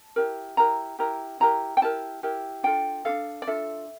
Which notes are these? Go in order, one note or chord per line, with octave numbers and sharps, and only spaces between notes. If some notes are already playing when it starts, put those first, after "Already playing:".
Already playing: A5
E4 G4 A#4
E4 G4 A#4 A#5
E4 G4 A#4 A#5
E4 G4 A#4 A#5
G5
E4 G4 A#4 A5
E4 G4 A#4
D4 F4 A4 G5
D4 F4 A4 F5
D5
D4 F4 A4 E5